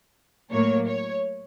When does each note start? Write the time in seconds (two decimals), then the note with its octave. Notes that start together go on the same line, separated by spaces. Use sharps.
0.51 A2 F#3 A#3 C#5
0.87 C#5